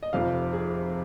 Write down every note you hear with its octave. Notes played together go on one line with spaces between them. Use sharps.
D#5
F1 F2 C3 F3 F5
G#4